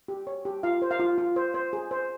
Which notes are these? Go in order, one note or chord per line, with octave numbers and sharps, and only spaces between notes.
G4
C#5
G4
F4 F5
C5
F5
F4
F4
C5
C5
G#4
C5